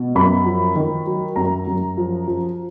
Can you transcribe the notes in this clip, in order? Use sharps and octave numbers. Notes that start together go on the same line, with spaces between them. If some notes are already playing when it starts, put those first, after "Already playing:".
Already playing: B2
F#2 B5
F3
D#3
F#3
F#2 A#5
F#2
F3
F3